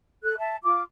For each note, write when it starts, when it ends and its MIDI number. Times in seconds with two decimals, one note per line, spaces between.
0.24 0.37 69
0.24 0.37 90
0.37 0.56 76
0.37 0.56 81
0.63 0.81 65
0.63 0.81 86